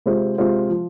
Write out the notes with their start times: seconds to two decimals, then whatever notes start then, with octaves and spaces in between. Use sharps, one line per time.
0.06 C3 G#3 F4 C5
0.38 C3 G#3 F4 C5
0.70 F3